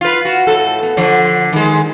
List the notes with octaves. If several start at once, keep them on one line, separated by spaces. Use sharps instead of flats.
F4 B4
F#4
A2 A4
B3
D3 F3
D#3 G#3